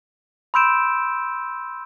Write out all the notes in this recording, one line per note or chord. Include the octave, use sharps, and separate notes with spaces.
B5 C6 E6 G6 D7 E7